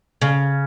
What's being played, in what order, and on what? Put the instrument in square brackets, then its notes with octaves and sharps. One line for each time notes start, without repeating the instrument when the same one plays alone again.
[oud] C#3